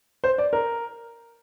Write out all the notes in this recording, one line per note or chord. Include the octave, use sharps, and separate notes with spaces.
C5
D5
A#4